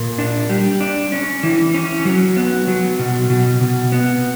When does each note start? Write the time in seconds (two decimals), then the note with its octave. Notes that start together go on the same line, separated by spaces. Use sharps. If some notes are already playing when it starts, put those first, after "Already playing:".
Already playing: A#2
0.18 D4
0.49 G3
0.80 D4
1.12 C#4
1.43 E3
1.74 C#4
2.05 F#3
2.37 B3
2.67 F#3
2.99 B2
3.30 B2
3.61 B2
3.92 B3